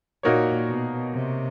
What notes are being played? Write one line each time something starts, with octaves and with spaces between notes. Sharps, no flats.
A#2 A#3 D#4 F#4 A#4 C#5
B2
C3